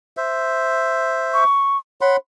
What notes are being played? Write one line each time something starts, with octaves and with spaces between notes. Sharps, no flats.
C5 E5
C#6
C#5 F#5 B5 C6